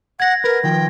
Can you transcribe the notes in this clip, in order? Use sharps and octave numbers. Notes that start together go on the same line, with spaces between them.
F#5 G#6 A#6
A#4 B4
D#3 F3 G5